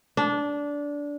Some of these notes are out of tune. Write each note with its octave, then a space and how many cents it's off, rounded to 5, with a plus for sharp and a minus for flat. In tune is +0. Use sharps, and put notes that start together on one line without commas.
D4 -15